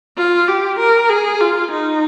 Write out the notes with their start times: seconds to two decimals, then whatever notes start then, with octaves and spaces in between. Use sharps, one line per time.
0.17 F4
0.48 G4
0.79 A#4
1.10 G#4
1.41 F4
1.72 D#4